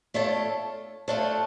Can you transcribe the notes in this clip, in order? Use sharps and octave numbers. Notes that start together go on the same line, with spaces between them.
A3 D4 F4 A4 C#5
A3 D4 F4 A4 C#5